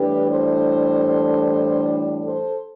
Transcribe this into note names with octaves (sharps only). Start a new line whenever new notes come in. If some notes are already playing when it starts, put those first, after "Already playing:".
Already playing: A2 E3 G3 D4 G4 B4
A4 C5
A4 C5